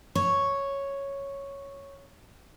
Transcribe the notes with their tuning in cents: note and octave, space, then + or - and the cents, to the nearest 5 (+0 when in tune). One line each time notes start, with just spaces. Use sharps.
C#5 +0